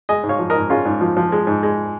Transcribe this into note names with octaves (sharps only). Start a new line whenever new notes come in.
G#3 D#5 G#5
G#2
C#5 F5
F3
A#4 D#5
G#2
G#3 C#4 F4
G#2
F3
F3
G#3
G#2
G#3